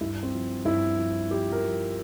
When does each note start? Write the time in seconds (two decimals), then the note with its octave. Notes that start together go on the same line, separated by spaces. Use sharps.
0.01 G2 E4
0.23 C4
0.33 F3
0.65 G2 E4
0.98 F3
1.30 F3 G4
1.52 A#4
1.63 F3